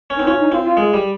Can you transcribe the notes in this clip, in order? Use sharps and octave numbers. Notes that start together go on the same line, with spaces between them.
C#4
C4 D#4
C#4 F4
D#4
C4 F4
F4
G#3
G3